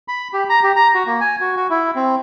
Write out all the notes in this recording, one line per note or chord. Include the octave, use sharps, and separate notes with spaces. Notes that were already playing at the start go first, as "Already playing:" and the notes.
B5
G4
A#5
G4
A#5
F#4
A#3
G#5
F#4
F#4
E4
C4